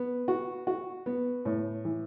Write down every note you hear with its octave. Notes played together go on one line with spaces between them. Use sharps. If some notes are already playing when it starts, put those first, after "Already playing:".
Already playing: B3
F#4
F#4
B3
A2
E3